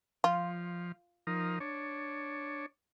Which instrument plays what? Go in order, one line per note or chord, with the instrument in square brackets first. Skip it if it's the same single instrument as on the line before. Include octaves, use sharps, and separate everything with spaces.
[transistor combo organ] F3 [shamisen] F4
[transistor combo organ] F3 D#4 A#4
D4 C#5